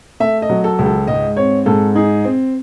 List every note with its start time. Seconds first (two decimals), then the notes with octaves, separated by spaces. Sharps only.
0.20 A3 E5
0.42 D#5
0.49 F#3
0.64 A4
0.79 C#2
0.86 A4
1.07 G#2 D#5
1.37 C4 C#5
1.66 G#2 A4
1.95 D#4 G#4
2.25 C4